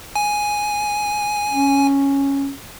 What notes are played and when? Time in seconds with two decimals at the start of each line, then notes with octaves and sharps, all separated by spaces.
0.16 G#5
1.51 C#4